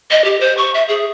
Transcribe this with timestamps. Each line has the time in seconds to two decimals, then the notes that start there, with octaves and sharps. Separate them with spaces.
0.11 D#5
0.25 G4
0.41 C5
0.57 C#6
0.75 E5
0.88 G#4